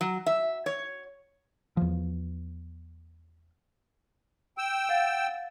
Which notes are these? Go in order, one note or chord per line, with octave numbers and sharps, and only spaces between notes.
F#3
E5
C#5
E2 F3
G5 E6
F5 F#5 A6